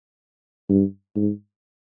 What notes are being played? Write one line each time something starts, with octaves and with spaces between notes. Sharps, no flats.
G2
G#2